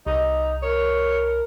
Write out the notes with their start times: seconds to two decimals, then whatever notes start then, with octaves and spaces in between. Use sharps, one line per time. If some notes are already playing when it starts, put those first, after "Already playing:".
0.06 C2 D#4
0.62 A#4 C#5